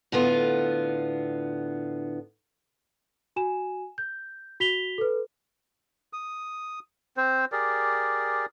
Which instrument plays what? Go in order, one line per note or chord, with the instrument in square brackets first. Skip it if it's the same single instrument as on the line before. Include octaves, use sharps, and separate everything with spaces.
[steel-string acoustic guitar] A2 D3 B3 F4
[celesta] F#4 G#5 E7
G6
F#4 B6 F7 G7
A4 B4
[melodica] D#6
C4 C5
G4 G#4 A#4 D5